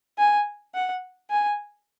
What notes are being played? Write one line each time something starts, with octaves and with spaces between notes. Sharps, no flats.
G#5
F#5
G#5